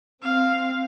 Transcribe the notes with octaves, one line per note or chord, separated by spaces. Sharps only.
C4 F5